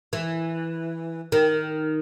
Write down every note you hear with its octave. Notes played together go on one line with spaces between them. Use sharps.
E3
D#3